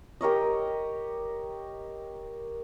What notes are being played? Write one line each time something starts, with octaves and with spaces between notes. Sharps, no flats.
G4 A#4 C#5 D#5